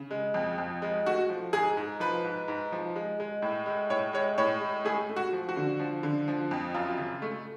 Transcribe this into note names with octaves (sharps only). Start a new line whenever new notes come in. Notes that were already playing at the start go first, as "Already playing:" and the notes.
Already playing: C#3
G#3
F2
F2
G#3
A3 F#4
F3
G#2 G#4
G#2
F3 B4
G#2
G#2
F3
G#3
G#3
A2
G#3
A2 C#5
G#3 C#5
A2 C#5
G#3
A3 G#4
A3
F#4
F3
F#4
D3
F3
D3
F3
F2
F#2 F4
C#3
A3